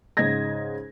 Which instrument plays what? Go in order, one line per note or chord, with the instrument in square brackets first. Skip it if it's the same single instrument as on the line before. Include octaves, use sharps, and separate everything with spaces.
[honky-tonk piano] G#2 C#3 D#5 G#6 A#6